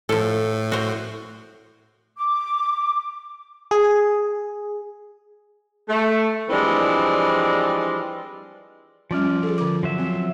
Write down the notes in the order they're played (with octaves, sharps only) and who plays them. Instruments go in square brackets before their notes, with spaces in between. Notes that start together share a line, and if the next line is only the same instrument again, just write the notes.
[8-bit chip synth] A2 [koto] F3 A4
[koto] F#4 C5
[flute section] D6
[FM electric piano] G#4
[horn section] A3
E3 F3 G3 G#3 C4 D4
[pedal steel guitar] F3 D5 F6 [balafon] G3 C#4 F4
[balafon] C#4
G#4 A4
D3 D6
[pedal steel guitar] F3 F#3 E5
[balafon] C4